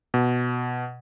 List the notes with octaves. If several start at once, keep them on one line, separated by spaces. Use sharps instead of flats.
B2